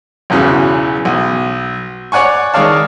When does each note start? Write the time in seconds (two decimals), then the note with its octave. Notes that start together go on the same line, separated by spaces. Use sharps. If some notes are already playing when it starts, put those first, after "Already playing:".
0.30 B1 E2 C#3 E3 F#3
1.05 B1
2.12 C#5 D5 F#5 G#5 C#6
2.54 D#3 G#3 C#5 D5 F5 A5